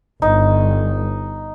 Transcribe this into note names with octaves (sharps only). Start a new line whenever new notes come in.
G1 D#4